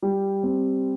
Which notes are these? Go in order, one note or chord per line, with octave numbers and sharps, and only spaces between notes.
G3
C4